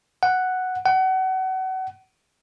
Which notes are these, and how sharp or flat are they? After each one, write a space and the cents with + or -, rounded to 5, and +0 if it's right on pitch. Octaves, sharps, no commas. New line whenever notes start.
F#5 +0
F#5 +30